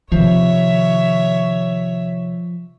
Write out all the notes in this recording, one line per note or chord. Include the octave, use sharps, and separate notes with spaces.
C3 D#3 F3 C#5 E5